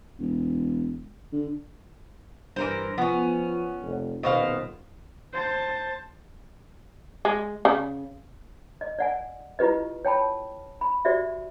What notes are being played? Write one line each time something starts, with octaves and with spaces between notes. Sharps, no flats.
E1
D3
G2 E3 A#4 C5
F3 B3 C#4
F1
D#1 B2 C5 F5
C5 A5
G#3
C#3
D#5
D5 F#5 G#5
E4 F4 G4 B4 D#5
C#5 G5 A5 B5
B5
F#4 G4 C5 D5 E5